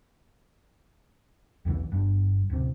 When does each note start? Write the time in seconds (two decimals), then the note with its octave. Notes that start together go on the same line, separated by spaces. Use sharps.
1.65 B1 E2 D#3 E3
1.92 G1 G2
2.50 D1 C3